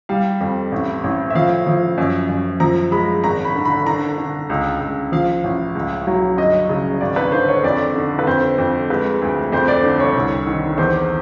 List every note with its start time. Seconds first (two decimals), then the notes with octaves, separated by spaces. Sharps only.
0.09 G3 F5
0.41 F2
0.72 A1
1.04 A1
1.30 E5
1.35 F3 F5
1.67 F3
1.98 F#2
2.29 F#2
2.60 F3 A#5
2.92 G#3 B5
3.24 G#1 A#5
3.45 B5
3.55 D3
3.65 B5
3.86 D3 A#5
4.18 D3
4.49 C#2
4.80 C#2
5.12 F3 F5
5.44 A1
5.75 C#2
6.07 F#3
6.37 G1 D#5
6.69 C#3
7.01 G#1 D5
7.16 B4
7.32 D3 C5
7.48 C#5
7.63 F2 D5
7.95 D3
8.19 B4
8.27 F2 C5
8.58 F2
8.90 G#3 B4
9.22 D2
9.52 F2 C5
9.68 D5
9.83 D3
10.00 C#5
10.15 C2
10.47 D#3
10.78 E2 C5